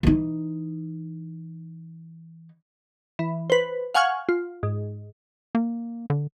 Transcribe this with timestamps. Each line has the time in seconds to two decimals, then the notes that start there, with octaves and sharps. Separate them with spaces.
0.03 E3 D#4
3.19 E3
3.50 B4 C5
3.94 F5 F#5 G#5 C#6 F6 G#6
4.29 F4
4.63 G#2
5.55 A#3
6.10 D3